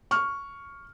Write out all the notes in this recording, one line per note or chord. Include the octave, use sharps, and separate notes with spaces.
C#6 F6